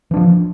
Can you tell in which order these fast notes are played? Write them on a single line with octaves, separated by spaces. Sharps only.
E3 D4 F3